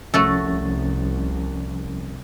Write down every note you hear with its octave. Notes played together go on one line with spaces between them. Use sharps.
C2 F3 A3 C#4 F#4 A4 A6